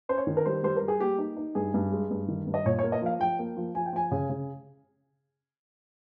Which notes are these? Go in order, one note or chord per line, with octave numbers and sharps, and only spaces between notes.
C#4 C5
C#5
D#3
A#4
G3 C5
G3 C5
A#4
G3
G#4
A#3 G4
D#4
D#4
G2 G#4
G2
G#3
G2
D#3
G2
D#5
A#2 C#5
C#5
A#3
D#5
F3 F5
F3 G5
A#3
F3
F3 G#5
G5
F3 G#5
C#3
C#3